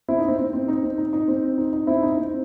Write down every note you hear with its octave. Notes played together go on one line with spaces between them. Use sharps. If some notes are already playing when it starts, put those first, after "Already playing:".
C4 E4
D#4
C4
C4
C4
D#4
C4
D#4
D#4
C4
D#4
D#4
C4 E4
D#4
C4